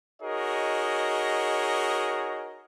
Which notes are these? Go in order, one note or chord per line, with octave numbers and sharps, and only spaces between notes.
D#4 F#4 G#4 A#4 C#5 D#5